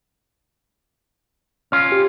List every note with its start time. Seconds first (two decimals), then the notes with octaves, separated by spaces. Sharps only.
1.72 C#4 F4 F6
1.92 G4